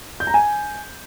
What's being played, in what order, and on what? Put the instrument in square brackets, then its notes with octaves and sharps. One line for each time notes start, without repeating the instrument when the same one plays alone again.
[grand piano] G6
A#5
G#5